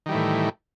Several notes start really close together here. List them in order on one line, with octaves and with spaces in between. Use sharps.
D#3 G3 E3 A2